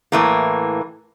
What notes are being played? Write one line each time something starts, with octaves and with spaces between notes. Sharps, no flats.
A2 E3 A#3